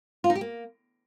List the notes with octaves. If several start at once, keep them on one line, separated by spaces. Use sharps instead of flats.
F4
D#4
G4
A#3